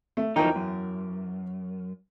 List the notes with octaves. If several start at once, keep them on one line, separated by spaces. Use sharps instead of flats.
A3
E2 F3 F#3 D#4 A#4 G5
F#2